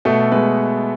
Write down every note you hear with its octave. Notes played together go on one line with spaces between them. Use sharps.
B2 A3 A4
G#3 B3 B4